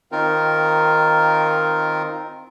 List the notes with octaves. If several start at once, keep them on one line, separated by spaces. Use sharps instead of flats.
D#3 C4 D#4 F4 A#4